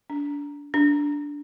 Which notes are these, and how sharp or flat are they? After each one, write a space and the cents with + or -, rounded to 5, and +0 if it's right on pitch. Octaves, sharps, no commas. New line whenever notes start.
D4 -25
D4 -10